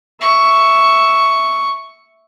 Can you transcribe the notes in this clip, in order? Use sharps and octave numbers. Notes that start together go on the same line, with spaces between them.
E5 C#6